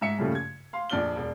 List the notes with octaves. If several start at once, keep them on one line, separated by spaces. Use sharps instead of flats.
G#2 E5 C#7
G2 A#2 C#3 F3 G3 A3
G#6
F5 C6
A#1 F2 D4 D5 F6 G7
E1 D5